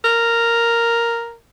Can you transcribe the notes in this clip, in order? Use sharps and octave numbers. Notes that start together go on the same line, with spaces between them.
A#4